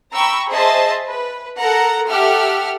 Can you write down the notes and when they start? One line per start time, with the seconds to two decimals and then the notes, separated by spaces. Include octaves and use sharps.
0.12 G5 A#5 B5 C#6 E6
0.50 G#4 C5 D#5 E5 A5 C6
1.07 B4
1.60 A4 A#4 F#5 A#5
2.08 G4 A4 E5 F#5 F6